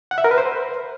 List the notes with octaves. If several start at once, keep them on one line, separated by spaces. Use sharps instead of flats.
F#5
E5
A#4
B4
C5